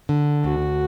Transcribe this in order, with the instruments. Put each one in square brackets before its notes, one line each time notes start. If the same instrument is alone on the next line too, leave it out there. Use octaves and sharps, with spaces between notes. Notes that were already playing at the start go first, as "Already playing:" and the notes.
[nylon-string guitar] D3
[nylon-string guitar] D2 [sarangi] F#4